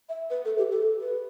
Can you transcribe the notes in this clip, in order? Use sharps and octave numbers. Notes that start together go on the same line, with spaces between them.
E5
B4
A4
G4
A4
B4